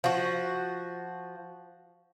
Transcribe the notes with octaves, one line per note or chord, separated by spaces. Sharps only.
F3 F#4